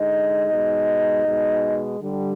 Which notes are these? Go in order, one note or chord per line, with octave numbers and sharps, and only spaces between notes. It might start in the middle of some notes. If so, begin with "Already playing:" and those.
Already playing: D3 G#3 D#4 D#5
B2 G#3
B2 G#3
D3 G3